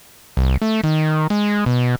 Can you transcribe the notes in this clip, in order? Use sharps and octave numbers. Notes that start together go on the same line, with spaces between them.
C2
A3
D#3
G#3
B2